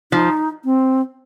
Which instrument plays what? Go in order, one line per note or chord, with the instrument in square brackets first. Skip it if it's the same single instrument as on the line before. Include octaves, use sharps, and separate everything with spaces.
[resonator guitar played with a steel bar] F3 [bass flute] D#4
[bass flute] C4